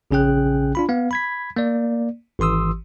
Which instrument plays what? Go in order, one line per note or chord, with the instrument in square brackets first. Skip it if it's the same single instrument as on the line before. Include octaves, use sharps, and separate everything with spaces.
[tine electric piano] A#1 C#3 C#4 G#4 G5 F#6
D4 F4 B5
B3 F5
B5 G#6 B6
A#3 D5
G#1 E3 C6 D#6 E6